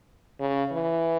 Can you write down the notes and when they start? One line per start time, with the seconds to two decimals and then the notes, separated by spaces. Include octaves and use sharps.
0.40 C#3
0.72 E3